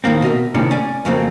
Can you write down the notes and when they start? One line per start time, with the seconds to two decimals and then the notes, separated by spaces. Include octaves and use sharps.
0.04 D#2 A2 D#3 A#3 C4
0.22 B2 A#4 D#5 E5
0.54 A2 C3 D#3 G#3 A#3 C#4
0.71 C#4 D5 G#5
1.05 F2 C#3 F#3 A3 A#3 C4